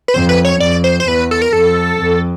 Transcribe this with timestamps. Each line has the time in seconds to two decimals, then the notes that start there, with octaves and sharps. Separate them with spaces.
0.08 B4
0.14 F2 C5
0.29 B4
0.45 C#5
0.60 F2 D5
0.84 C5
1.00 C5
1.07 E2 B4
1.31 A4
1.42 A#4
1.53 F2 A4
2.01 F2